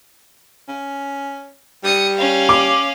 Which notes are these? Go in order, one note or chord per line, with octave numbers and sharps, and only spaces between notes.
C#4
G3 D#6 C#7
C#4 F5
D6